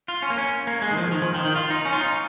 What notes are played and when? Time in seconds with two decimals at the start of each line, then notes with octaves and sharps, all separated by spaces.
0.08 F4
0.22 C#4
0.30 A#3
0.38 C#4
0.67 A#3
0.82 G#3
0.91 D#3
0.97 F3
1.12 D#3
1.22 F3
1.35 D#3
1.45 D#3
1.56 F4
1.70 D#4
1.85 C#4
1.93 F4
2.01 D#4